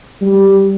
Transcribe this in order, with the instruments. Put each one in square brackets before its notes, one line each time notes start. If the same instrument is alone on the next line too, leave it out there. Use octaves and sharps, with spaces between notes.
[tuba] G3